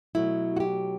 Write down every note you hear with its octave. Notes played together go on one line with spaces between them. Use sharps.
B2 F#3 A3 E4
F#4
G4